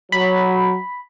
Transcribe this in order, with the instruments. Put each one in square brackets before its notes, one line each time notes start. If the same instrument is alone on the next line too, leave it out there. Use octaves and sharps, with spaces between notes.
[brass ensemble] F#3 [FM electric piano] B5